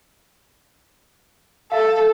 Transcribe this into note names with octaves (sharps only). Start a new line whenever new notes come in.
A4 E5 F5